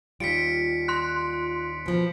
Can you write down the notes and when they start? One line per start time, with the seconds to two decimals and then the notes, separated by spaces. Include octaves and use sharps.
0.20 D#2 G3 F4 B6 C#7 D7
0.88 C6 F#6
1.86 B2 F3